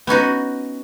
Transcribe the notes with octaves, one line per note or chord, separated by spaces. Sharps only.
B3 C#4 D#4 F#4